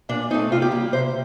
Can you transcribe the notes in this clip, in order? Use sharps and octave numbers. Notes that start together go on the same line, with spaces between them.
A#2 D4
A3 C4 D#4
C3 F4
G4
G3 A#3
C3 C5